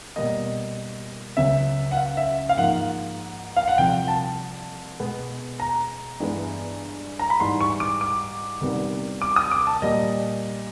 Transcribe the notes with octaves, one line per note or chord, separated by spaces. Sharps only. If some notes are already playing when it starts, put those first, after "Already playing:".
B2 G3 A#3 D#5
C#2 C#3 F#3 E5
F#5
F5
E5
F5
G#2 F3 A#3 F#5
F5
F#5
C2 C3 F3 G5
A5
B2 G#3 B3
A#5
G2 E3 G#3 B3
A#5
B5
G#2 E3 G3 C6
C#6
D6
D6
C2 C3 D#3 G3 B3
D6
D#6
D6
A5
A#2 G3 A#3 D#5